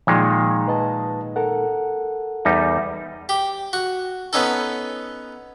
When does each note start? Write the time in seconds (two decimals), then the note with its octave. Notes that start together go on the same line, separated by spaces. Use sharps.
0.07 A#2 D#3 F3 G#3
0.68 B4 D#5 A5
1.36 A4 A#4 F#5
2.45 E2 G3 D#4
3.29 G4
3.73 F#4
4.33 B3 C#4 D#4 A4